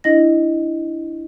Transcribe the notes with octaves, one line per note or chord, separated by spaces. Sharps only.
D4 E4 D#5 A#6